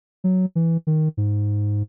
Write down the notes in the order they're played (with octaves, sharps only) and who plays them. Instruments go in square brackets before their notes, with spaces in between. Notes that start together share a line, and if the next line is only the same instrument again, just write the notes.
[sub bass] F#3
E3
D#3
G#2